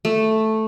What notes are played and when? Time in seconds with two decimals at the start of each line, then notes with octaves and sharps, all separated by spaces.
0.05 A3